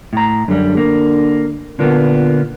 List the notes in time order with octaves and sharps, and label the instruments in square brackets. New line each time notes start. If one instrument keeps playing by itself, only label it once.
[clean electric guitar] A2 A#5
[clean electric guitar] F#2 G3 [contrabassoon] D3
[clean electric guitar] A#3
[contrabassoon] A#2 [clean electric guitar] D3 A#3 B3